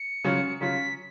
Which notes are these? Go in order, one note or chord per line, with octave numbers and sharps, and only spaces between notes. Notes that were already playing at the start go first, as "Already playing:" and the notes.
Already playing: C#7
C#3 F#3 C#4 F4
C#3 F#3 C#4 F4 B6